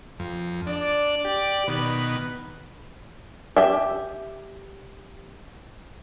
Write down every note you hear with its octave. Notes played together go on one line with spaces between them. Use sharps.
F2
D4 D5
G4
B2 D#3 B4
G4 E5